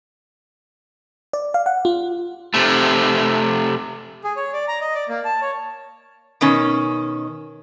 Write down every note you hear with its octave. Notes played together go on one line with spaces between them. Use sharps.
D5
F5
F#5
F4
C3 A3
G#4
C#5
D5
A#5
D#5
D5
A#3
A5
C#5
B2 D#3 C#4